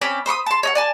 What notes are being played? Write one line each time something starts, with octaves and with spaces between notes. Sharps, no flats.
C4 C#4 D5 B5
C5 B5 C#6 D#6
A5 C6
C#5 D#5 F#5
D5 G#5 A5